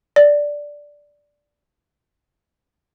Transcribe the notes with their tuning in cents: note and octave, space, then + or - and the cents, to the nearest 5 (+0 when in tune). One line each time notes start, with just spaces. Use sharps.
D5 -5